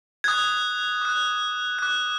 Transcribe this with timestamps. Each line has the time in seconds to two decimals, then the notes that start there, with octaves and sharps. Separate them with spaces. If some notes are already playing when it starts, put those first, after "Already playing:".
0.24 D#6 F#6 G#6
1.01 D6 F#6
1.79 D6 F#6